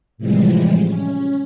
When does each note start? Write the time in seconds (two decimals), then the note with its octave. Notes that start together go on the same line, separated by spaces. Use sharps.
0.18 A2 C3 E3 F3 G3 G#3
0.85 C#4